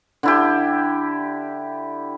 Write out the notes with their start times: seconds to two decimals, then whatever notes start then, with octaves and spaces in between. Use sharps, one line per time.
0.23 D3 E4 G4